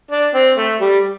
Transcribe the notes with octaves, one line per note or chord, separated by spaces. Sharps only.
D4
C4
A3
G3